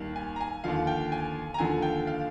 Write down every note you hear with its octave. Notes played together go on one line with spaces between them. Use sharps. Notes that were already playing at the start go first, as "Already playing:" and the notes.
Already playing: D#2 D#3 G3
G#5
A#5
G#5
D#2 D3 F3 F5
G5
G#5
A#5
D#2 D3 F3 G#5
G5
F5